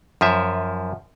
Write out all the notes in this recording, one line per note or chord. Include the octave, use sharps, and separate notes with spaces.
F#2 F3 E5